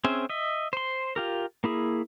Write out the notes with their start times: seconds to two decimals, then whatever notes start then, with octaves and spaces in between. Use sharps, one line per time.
0.04 C4 C#4 G#4 C5 E5
0.29 D#5 E5
0.73 C5 C6
1.16 F4 G4 A#4
1.64 A#3 E4 G#4